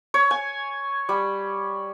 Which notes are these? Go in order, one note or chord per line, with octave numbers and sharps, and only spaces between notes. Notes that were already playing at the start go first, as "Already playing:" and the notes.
C#5
G#5
G3